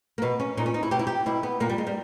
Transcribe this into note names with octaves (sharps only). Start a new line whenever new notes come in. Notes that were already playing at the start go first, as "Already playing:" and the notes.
A#3
B2 B3
C#4
A#2 D#4
C#4
D#4
E4
B2 G4
E4
G4
B2 E4
B3
A#2 A#3
G3
G#3
G3